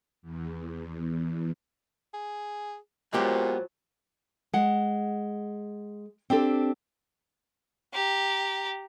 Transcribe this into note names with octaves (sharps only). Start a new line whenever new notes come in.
E2
G#4
A#2 F3 F#3 G#3 B3 G4
G#3 F#5
C4 D4 G4 A4
G4 A#5